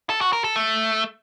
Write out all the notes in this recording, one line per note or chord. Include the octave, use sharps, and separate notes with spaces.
A4
F#4
A#4
A4
A3